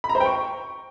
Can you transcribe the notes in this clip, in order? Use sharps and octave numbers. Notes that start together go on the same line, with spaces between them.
B5
A#5
C5
G5
C#6